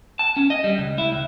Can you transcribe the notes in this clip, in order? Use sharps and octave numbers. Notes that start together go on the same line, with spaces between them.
A5
C#4
D#5
G3
C#2
E4
C#2